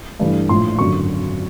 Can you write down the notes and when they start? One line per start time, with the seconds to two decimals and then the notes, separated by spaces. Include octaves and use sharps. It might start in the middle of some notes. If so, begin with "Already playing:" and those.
0.20 G2 E3 A3
0.49 A#1 A2 F3 C6
0.79 G#1 F#2 D3 F#3 C#6